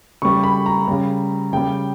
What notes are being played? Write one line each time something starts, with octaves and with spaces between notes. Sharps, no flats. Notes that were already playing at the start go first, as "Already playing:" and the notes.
C#3 G3 C#6
B5
A#5
C#3 G3
C#3 G3 G5